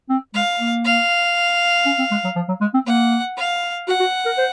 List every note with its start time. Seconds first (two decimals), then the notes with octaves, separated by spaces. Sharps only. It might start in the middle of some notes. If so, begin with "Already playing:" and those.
0.09 C4
0.34 G#3 F5
0.60 A#3
0.85 F5
1.86 C#4
1.99 C4
2.11 G#3
2.24 F#3
2.36 F3
2.48 F#3
2.61 G#3
2.74 C4
2.87 A#3 F#5
3.38 F5
3.88 F#4 F#5
4.00 F#4
4.26 A#4
4.38 C5